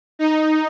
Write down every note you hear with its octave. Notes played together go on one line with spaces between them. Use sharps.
D#4